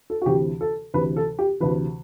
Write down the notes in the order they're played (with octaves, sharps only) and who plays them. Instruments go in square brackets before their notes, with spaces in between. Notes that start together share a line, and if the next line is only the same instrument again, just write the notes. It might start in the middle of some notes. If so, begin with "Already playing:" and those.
[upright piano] A4
F#4
D2 C3 E3 G4
A4
D2 C3 E3 B4
A4
G4
D2 C3 E3 B4